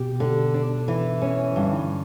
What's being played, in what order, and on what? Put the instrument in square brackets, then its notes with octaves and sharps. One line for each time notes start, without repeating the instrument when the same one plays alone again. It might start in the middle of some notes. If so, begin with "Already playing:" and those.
Already playing: [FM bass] B2 [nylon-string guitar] G4
[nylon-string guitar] D3
D4
E3
C#4
[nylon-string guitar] G2 [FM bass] D3